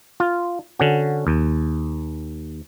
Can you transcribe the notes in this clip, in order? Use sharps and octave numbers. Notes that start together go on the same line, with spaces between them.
F4
D3 C#4 F#4
D#2